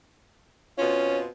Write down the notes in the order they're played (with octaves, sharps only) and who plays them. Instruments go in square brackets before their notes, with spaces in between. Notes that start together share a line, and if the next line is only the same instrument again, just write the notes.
[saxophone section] B2 C4 F4 [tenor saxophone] C#4